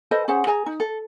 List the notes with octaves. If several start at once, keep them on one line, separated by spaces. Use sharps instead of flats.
A4 B4 C5 D#5
C#4 G#4 C5 F#5
G#4 G#5 A#5
D#4
A4